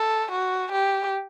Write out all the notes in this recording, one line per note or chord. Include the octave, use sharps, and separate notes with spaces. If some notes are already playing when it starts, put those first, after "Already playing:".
Already playing: A4
F#4
G4